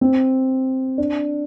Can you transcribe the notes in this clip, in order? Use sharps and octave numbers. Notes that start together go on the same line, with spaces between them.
C4
D4